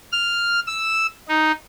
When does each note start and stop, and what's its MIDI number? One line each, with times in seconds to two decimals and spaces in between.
0.12 0.60 89
0.67 1.07 88
1.29 1.52 63